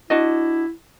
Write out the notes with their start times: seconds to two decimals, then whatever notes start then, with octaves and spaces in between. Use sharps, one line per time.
0.10 D4 E4 F#4 D#5